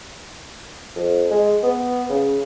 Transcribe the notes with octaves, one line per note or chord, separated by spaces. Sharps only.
F2
G#3
B3
C#3